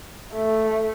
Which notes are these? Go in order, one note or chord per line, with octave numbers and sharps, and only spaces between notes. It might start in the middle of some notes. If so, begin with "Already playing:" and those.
A3